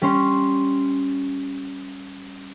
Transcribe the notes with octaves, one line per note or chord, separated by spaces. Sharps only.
G3 C#4 C6